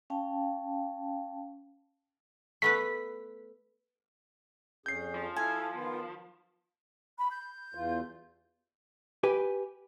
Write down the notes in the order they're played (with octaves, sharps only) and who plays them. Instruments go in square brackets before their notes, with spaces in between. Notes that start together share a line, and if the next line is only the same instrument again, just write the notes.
[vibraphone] C#4 F5 G5 A5
[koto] A3 B3 B4 [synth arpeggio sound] B6
[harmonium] F2 C#4 G#4 [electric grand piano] G6 C7
[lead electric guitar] F3
[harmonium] E4 A4 F5 [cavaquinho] G#5
[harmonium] D#3 B3 F4
[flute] B5
G6
[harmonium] E2 E3 F4
[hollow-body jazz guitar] G4 B4 G#5